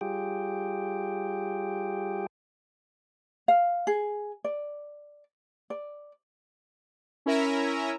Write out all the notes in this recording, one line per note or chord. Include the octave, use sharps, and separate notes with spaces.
G3 F4 G4 G#4 G5
F5
G#4
D5
D5
C#4 E4 A#4 E5 G#5 A#5